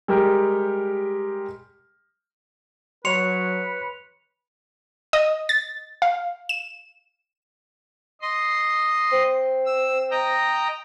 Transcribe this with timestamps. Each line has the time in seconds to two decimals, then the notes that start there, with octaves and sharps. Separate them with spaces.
0.08 G3 G#3 G4 A#4
3.05 F#3 B4 C#5 C6 C#7 F7
5.13 D#5
5.49 A6
6.02 F5
6.49 E7
8.21 D#5 C6
9.12 C4
9.66 E6
10.11 D#5 G5 A#5